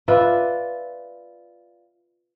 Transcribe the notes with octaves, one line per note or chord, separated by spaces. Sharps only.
F4 B4 D5 E5